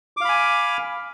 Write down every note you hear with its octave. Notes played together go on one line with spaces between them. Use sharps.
F5 G#5 B5 D6